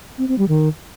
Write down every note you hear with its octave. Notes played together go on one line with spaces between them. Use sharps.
C4
C4
G3
D#3